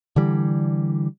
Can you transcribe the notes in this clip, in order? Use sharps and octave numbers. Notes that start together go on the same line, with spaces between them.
D3 E3 G3